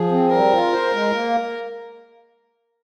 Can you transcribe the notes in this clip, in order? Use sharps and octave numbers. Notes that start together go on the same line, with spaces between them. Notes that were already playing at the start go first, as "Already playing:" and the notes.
Already playing: F3 G#4
C4
G3 A#4
F4
C5
G#3
A#3